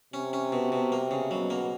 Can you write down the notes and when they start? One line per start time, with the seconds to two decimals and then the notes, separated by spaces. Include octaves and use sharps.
0.13 C3 C#4
0.33 C#4
0.52 B2
0.72 B2
0.92 A#3
1.11 C#3
1.31 B2 F#3
1.50 A#3